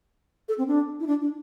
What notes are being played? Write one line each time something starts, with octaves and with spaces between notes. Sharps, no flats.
A4
C4
D4
E4
D4
D4